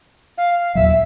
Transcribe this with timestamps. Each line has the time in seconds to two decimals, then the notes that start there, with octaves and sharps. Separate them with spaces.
0.38 F5
0.75 D#2 A#2 F#3 E5
0.88 E5